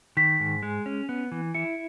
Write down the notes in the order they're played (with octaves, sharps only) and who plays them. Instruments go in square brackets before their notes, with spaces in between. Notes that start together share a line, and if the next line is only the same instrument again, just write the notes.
[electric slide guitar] D#3 [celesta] B6
[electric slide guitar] G#2
G#3
C#4
B3
E3
[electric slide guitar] E4 [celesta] C#7